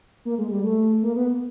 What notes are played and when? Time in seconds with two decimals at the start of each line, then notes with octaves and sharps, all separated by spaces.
0.25 A#3
0.38 G#3
0.51 G3
0.64 A3
1.03 A#3
1.16 B3